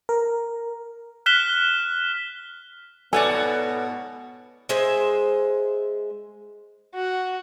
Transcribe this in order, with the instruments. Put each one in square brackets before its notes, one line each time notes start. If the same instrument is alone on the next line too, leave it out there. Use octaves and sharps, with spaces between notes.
[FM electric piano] A#4
[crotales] F6 F#6 B6 E7 G7
[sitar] G#2 B2 F#4 [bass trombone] B3 [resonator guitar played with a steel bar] A4 C#5 D5 [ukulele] G#5
[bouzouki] G#3 G#4 C5 E5
[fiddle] F#4